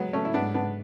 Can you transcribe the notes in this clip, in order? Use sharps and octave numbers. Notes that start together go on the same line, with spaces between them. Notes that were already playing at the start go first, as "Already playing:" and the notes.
Already playing: F#3 G#3 B3
A3 C#4
E4
G#2 B3 D4
B3 D4